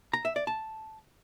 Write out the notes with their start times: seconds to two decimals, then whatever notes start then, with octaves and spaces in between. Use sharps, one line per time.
0.13 A#5
0.25 E5
0.36 D5
0.47 A5